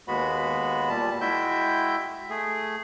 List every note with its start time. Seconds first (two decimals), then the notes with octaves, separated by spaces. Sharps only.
0.08 D#2 G#3 B3 F#4 B5
0.89 A#2 G3 A5
1.21 G#3 E4 F#4 E5 G5 G6
2.30 A3 G#4